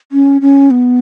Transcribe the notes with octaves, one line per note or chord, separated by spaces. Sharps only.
C#4
C#4
B3